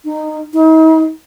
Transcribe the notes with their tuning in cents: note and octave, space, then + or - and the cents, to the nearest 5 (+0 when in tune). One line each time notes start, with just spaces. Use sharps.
D#4 -15
D#4 +45